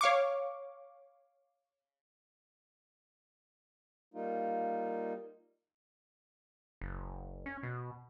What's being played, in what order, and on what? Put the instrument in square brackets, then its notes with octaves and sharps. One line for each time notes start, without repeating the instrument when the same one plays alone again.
[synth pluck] C#5 F5 C#6 D6
[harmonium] G3 A#3 D#4 F4
[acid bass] F#1
C#4
B2